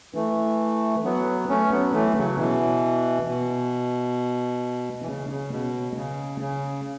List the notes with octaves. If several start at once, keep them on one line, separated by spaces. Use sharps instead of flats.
E3 A3
F#3 B3
A3 C#4
F#3 B3
E3 A3
C#3 F#3
B2 E3
B2
E3
C#3
C#3
B2
C#3
C#3